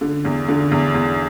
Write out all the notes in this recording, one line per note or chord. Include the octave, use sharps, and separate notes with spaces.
D3
E2
D3
E2
E2